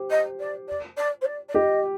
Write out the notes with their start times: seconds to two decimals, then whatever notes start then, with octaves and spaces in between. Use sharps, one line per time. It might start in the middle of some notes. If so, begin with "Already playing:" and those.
Already playing: G4 C5
0.10 D#5
0.39 D5
0.68 D5
0.97 D5
1.21 C5
1.25 D5
1.48 D5
1.53 G4 D#5